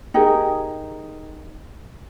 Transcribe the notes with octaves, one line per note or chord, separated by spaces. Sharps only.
D#4 G4 G#4 A#4